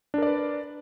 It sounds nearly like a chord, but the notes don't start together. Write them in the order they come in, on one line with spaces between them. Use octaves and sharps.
D4 A#4 D5 B4